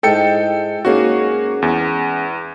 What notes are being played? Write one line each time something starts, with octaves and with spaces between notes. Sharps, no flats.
G#2 G#3 E4 A4 G5 C#7
G#2 A#3 C#4 F#4 G#4
E2